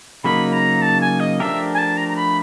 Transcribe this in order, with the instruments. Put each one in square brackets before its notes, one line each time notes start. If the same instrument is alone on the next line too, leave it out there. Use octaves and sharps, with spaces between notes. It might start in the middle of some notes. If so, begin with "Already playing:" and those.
[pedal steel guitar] C#3 F#3 A#3 D#4 [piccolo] B5
[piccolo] A#5
A5
G#5
D#5
[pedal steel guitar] F3 A3 D4 G4 A#4 [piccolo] E5
[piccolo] G#5
A5
A#5
A#5
B5